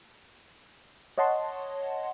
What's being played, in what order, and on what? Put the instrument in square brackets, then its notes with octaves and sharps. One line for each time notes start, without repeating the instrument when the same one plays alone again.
[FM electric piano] C#5 D#5 F#5 A5 C6